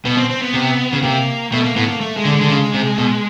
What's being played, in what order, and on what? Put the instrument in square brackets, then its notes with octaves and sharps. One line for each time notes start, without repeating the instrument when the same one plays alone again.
[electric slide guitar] B2 [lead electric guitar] B3
[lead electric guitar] C4
C4
B3
[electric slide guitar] C3
C#3
[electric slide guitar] C3 [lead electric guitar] A#3
[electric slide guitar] B2 [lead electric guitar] A3
[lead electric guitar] A#3
[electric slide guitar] A2 [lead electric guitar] B3
[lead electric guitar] A#3
A3
G#3
[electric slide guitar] D3
[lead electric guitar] G#3
[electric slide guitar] D3
C#3
C3
B2